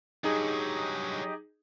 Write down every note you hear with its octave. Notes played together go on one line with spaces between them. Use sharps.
G2 F#3 D#4 G4 G#4 D#5